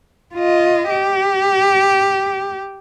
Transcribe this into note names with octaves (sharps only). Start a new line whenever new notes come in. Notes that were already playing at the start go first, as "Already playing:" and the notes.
F4 D#5
G4